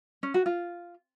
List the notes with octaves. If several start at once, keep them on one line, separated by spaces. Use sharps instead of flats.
C#4
F#4
F4